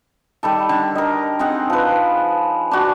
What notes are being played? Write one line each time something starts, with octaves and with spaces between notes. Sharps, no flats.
D#3 G3 A4
D3
A#4 D#5
C4 D#4 G#4 F#5
F3 B4
D4 F#4